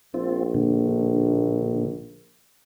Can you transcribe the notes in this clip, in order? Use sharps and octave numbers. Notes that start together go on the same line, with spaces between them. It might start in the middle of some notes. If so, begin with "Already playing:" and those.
A#1 C4 F4
A#2 D3